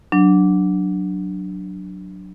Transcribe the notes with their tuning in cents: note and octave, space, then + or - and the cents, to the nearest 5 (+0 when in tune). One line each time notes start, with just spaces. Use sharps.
F#3 +0 D4 +0